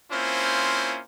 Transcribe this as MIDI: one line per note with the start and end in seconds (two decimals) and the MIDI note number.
0.11 1.00 58
0.11 1.00 60
0.11 1.00 61
0.11 1.00 64
0.11 1.00 65
0.11 1.00 72